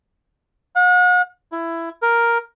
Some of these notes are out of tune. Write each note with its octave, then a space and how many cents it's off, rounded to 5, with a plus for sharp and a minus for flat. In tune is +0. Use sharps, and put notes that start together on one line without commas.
F#5 -40
E4 +15
A#4 +5